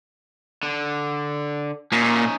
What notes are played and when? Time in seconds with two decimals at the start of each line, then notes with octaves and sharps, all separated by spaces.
0.63 D3
1.92 A#2 C#4 D#4